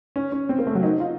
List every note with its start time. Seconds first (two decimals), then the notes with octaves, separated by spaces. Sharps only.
0.16 C#4
0.32 C#4
0.49 C4
0.59 A#3
0.67 A3
0.75 F#3
0.83 D#4
1.00 F4